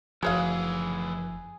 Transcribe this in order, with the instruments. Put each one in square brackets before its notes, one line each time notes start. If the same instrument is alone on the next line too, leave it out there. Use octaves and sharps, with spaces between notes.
[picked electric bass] F#1 F3 [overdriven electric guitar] D2 E3 [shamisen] F#4 C#5 F5 [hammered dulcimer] G#4